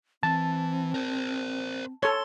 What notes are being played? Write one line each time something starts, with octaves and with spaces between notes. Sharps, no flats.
E3 C4 A5
A#4 C5
A4 C#5 C6